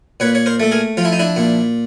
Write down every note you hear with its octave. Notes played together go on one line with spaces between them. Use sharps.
A#2 B4 C#5
C#5
A#4 C5
A3 A4
G#4 A#4
F3 F4
E4
D#4
D4 E4
A#2